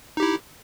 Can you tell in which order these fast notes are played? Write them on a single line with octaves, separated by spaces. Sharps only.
D#4 G4 E4